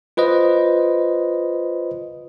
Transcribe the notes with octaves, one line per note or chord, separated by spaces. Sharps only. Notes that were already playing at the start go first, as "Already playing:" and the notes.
F4 B4 C5 D#5